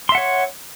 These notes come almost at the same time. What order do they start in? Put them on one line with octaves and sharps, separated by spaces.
C6 E5 F#5 C#5